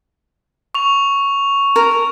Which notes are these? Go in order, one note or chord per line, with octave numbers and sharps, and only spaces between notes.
C#6 F7
A#4